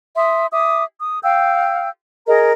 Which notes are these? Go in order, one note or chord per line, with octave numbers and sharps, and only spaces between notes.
E5 C6 D#6
E5 D6 D#6
D#6
F5 G5 E6 G6
G#4 A#4 D#5 A#5